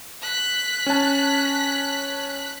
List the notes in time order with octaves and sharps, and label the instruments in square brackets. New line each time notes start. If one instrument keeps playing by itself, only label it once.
[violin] F#6 B6
[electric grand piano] C#4 A5